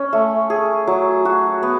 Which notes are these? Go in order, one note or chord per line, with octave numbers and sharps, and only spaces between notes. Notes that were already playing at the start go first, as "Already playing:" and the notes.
Already playing: C#4
A3
G#4
F#3
F#4
B3